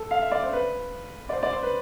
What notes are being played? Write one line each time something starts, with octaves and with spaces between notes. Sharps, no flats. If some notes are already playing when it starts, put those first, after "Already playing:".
Already playing: A4
F5
E5
D5
C5
B4
D5
C5
D5
C5
B4